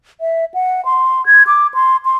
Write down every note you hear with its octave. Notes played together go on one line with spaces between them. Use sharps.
E5
F#5
C6
G#6
D6
C6
C6